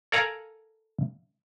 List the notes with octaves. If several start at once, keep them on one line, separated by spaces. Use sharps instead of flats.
A4 A#4 D5 F5 G#5 A#5